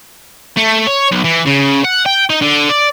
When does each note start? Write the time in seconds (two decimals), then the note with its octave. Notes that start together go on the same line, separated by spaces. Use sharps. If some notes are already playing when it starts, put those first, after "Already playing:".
0.57 A3
0.87 C#5
1.11 B1
1.24 E3
1.46 C#3
1.84 F#5
2.06 G5
2.30 D#4
2.42 D3
2.69 D5